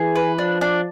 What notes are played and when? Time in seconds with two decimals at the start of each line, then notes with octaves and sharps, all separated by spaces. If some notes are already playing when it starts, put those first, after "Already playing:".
Already playing: E3 G#4
0.15 B4
0.38 F3 D4
0.61 D4